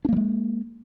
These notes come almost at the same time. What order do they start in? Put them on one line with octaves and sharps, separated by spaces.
D4 A#3 G3 G#3